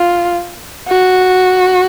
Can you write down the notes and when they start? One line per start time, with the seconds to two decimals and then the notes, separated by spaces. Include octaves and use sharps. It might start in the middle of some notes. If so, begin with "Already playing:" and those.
Already playing: F4
0.88 F#4